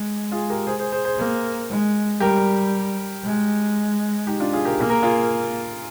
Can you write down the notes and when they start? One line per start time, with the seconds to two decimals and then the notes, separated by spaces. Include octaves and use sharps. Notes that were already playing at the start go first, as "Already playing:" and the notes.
Already playing: G#3
0.32 F4 G#4
0.50 G4 A#4
0.67 G#4 C5
0.79 G#4 C5
0.92 G#4 C5
1.05 G#4 C5
1.18 A#3
1.70 G#3
2.20 G3 G4 A#4
3.24 G#3
4.27 D#4 G4
4.40 D4 F4
4.53 F4 G#4
4.65 G4 A#4
4.78 A#3 G#4
4.90 A#4
5.03 F4 G#4